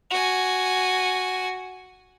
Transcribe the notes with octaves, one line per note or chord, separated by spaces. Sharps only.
F#4 G#5